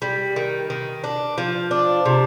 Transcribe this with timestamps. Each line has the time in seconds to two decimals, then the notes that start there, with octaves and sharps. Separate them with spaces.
0.02 G3
0.36 D#3
0.70 D#3
1.04 D4
1.38 F3
1.71 D4
2.06 C3